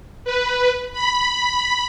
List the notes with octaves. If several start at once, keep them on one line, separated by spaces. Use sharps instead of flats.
B4
B5